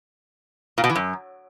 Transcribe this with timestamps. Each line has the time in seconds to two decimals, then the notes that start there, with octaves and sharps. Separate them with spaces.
0.78 A#2
0.84 B2
0.90 E3
0.95 F#2